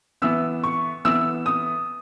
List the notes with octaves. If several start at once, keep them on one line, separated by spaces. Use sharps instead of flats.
E3 B3 E6
C#6
E3 B3 E6
D#6